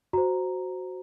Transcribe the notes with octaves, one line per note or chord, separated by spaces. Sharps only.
F#4 C5 A#5